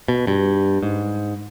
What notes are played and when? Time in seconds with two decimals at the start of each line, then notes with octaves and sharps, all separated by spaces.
0.08 B2
0.27 G2
0.83 G#2